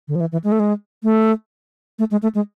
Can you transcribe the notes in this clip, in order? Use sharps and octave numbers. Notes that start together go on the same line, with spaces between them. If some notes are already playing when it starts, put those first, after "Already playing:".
D3
F3
E3
E3
G#3
A3
G#3
A3
A3
G#3
A3
G#3